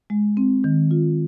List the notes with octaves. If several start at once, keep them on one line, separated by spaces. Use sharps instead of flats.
G#3
C4
D#3
F4